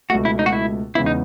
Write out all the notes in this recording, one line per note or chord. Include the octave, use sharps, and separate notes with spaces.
C#2 B2 A3 F#4
E4
D#4
F#4
E4
E2 C#3 G#3 B3 E4
D#4